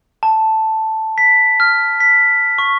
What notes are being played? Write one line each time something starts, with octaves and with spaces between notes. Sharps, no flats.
A5
B6
F6
B6
C#6